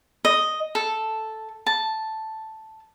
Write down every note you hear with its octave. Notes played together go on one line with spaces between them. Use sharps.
D#5
A4
A5